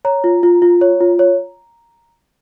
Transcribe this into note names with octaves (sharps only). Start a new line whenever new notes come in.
C#5 A#5
F4
F4
F4
C#5
F4
C#5